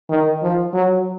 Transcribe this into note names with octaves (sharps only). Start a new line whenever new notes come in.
D#3
F3
F#3